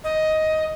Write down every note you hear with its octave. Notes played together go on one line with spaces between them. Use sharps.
D#5